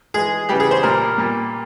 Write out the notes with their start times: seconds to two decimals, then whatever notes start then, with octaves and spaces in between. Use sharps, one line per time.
0.14 E3 G#3 G#4
0.49 C#3 E3 G3 G4
0.60 G#4
0.71 C5
0.83 A#2 G3 A#3 A#4
1.17 A#2 G3 A#3